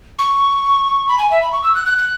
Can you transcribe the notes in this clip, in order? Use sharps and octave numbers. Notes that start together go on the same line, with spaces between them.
C#6
B5
G#5
E5
B5
C#6
E6
F#6
F#6
F#6